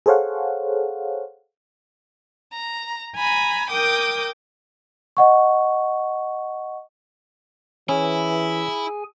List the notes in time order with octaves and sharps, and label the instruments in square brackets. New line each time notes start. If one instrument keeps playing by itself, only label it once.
[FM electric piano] G#4 A4 C5 C#5 F5 F#5
[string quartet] A#5
G#5 A#5 B5
A#4 G5 D6 D#6 G6
[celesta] D#5 F#5 C#6
[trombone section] E3 [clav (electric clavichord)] C#4 [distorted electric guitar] E4 [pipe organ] G#4 G#5